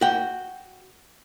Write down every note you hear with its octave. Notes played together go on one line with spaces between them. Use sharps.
F#4 G5